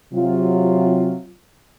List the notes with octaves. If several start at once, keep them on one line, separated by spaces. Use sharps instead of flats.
C3 F#3 F4